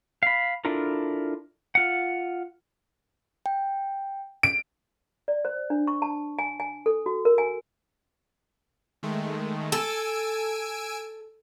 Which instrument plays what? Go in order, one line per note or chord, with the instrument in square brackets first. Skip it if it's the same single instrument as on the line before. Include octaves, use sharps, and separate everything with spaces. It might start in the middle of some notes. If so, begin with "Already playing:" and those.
[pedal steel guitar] F5 B5
D4 E4 F4 A4 A#4
F4 F#5
[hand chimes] G5
[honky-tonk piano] D7
[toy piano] D5
C5
D4
C#6
A5
G#5
G#5
A4
F#4
A#4
G#5
[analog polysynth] D#3 G#3 A3
[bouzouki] A4 [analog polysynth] G#5 E6 D7